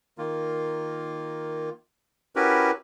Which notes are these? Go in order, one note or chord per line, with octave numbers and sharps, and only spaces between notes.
D#3 A#3 F4
C#4 E4 F#4 G4 A#4 B4